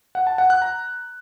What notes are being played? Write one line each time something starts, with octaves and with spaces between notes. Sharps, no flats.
F#5
A5
F#5
F#6
A#5